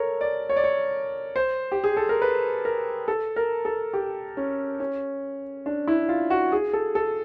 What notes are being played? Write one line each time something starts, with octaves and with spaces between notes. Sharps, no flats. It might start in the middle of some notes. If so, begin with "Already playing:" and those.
Already playing: A4 A#4 C#5
D5
C#5
D5
C#5
C5
G4
G#4
A4
A#4
B4
A#4
A4
A#4
A4
G4
C#4
C#4
D4
E4
F4
F#4
G#4
A4
A4